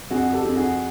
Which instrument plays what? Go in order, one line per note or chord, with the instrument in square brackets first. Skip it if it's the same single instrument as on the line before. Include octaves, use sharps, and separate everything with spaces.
[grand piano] F2 F#4 G#4
G4 A4
F2
F#4 G#4